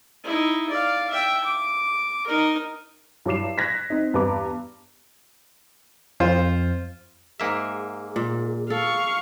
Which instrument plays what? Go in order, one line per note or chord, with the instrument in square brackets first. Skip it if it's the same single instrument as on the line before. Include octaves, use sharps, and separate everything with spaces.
[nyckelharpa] D#4 E4
D5 F5
E5 G5
D6
D#4 A#4
[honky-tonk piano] G2 F#3 E4 D6 C7 E7
F#6 G#6 A#6 B6
C4 D#4
E2 G2 B3 B4 A#5 D6
[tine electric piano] F2 [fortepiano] F4 C5
[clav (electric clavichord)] G#2 A#3 E5 [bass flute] G#4
[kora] A#2
[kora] A4 [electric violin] F5 C#6